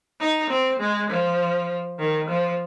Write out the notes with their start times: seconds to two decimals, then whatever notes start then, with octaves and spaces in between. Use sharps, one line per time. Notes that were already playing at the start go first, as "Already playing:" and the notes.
0.20 D#4
0.50 C4
0.80 G#3
1.09 F3
1.99 D#3
2.29 F3